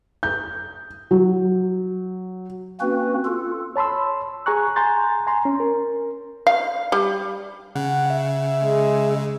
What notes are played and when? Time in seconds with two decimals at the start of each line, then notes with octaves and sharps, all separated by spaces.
0.23 G6
1.11 F#3
2.80 A#3 C4 C#4 F#4 B4
3.25 F4 A4
3.76 C#5 A5 B5 C6 E6
4.46 G#4 G#5 A#5 C#6 F#6
4.76 G#5 A#5 C6 G6 A6
5.27 G#5 A#5 C6
5.45 C#4
5.60 A#4
6.47 F5
6.92 G3
7.75 C#3 F#5
8.10 E5
8.63 G#3